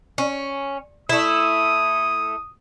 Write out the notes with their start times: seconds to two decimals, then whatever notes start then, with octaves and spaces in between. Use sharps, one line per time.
0.18 C#4
1.09 A3 E4 D#6